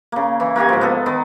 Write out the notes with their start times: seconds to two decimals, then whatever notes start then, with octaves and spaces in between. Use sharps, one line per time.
0.12 C#3 A#3
0.40 E3
0.56 A#3 F#4 G4 G#5
0.69 G#2 F3
0.81 B3 A4
1.06 D#3 B3